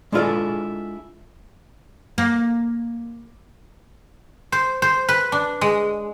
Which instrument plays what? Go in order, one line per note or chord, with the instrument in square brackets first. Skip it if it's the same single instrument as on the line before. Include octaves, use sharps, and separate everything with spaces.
[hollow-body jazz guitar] G#3 D4 E4 F4 G#4 A4
[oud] A#3
[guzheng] C5
C5
B4
D4
G#3